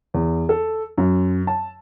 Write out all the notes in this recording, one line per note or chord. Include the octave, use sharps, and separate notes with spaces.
E2
A4
F#2
A5